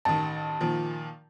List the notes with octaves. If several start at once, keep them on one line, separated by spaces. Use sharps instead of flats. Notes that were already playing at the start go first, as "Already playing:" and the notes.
A1 D#3 A5
A#2 D#3 F3